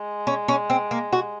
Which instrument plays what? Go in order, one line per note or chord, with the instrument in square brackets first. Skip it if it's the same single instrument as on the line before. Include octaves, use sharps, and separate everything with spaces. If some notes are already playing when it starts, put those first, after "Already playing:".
Already playing: [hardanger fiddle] G#3
[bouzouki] C#4
C#4
C4
A#3
F#4